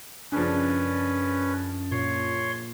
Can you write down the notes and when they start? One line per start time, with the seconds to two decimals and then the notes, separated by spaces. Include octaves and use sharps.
0.32 F#2 C#3 F3 C#4 D4 B4
1.91 A#2 C#5 C6